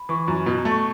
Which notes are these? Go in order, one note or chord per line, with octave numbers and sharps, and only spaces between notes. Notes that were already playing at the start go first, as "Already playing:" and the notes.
Already playing: B5
E3 C#6
F#2
B2
A3
C#6